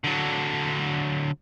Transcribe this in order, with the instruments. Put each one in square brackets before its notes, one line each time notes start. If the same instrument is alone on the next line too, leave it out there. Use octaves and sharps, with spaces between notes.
[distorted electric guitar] D3 F#3